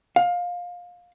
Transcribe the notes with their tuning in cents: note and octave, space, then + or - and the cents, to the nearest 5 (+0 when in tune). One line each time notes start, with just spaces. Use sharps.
F5 +20